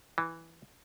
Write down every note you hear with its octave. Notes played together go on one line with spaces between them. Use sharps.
E3